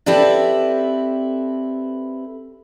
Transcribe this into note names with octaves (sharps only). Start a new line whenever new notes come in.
C4 E4 G4 A4 B4 D5